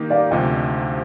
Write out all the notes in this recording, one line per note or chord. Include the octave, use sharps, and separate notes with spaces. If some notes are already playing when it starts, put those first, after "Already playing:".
Already playing: D#3 A#3 D#4 G4 A#4
D5 F5
D2 C3 F3 D#5 G5